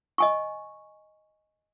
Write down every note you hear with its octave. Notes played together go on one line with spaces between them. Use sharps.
D#5 G#5 C#6